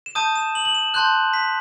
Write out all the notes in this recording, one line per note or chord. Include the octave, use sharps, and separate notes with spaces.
E7
A5 D#6 G6 D#7
E7
F#7
F#7
E7
A5 C6 F#6 G6
B6